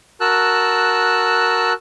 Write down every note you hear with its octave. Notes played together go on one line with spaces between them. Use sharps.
F#4 A#4 A5 E6 F#6